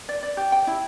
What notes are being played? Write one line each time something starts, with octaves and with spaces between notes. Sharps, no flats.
D5
D5
G4
G5
E4